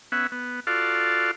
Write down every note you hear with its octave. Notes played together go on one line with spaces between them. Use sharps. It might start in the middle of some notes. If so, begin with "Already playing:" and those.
B3 C#4 E5 F#5
B3
F4 F#4 A4 D5 F5